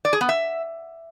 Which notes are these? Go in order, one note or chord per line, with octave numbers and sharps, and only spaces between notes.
D5
G#4
B3
E5